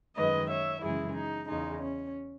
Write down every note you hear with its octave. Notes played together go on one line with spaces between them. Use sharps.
F#2 D#3 G#3 B4 D#5
C#5 E5
F#2 C#3 E3 G#3 E4 G#4
D#4
E2 C#3 G#3 D#4
C#4